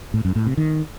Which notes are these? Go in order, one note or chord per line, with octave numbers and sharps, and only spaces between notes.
A2
F#2
A2
C3
D#3